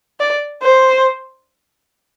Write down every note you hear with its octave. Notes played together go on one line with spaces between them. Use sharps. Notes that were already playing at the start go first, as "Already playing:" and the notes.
D5
C5